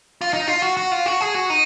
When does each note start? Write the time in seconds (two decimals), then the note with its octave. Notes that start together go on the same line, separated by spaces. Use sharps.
0.21 F4
0.33 D#4
0.47 F4
0.62 F#4
0.77 F#4
0.91 F4
1.06 F#4
1.21 G#4
1.34 F#4
1.50 D#4